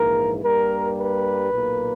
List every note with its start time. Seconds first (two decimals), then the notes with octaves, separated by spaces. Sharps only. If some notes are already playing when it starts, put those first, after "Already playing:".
Already playing: A#1 G#2 E3 A#3 A#4
0.43 G2 G3 A#3 A#4
0.98 B4
1.52 B1 A#2 A#3